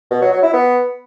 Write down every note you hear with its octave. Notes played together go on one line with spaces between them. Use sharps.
B2
F#3
F#3
E4
B3